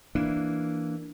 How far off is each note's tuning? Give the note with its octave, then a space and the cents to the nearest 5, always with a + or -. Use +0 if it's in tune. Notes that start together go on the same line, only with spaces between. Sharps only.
E3 +0 A#3 +0 D4 +0